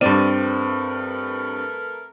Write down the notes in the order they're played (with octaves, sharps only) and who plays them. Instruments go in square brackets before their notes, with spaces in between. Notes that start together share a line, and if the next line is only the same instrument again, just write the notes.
[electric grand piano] G2 D#7 [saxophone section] A3 A#4 B4 [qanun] C4 [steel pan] D5